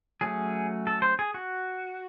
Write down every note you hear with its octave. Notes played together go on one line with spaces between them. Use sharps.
F#3 A3 C#4 G#4
A4
C5
G#4
F#4